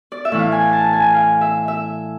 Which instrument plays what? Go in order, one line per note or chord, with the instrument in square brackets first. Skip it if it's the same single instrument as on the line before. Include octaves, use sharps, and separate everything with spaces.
[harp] D5
E5
A2 E3
F5
G#5
A5
G#5
F5
E5
E5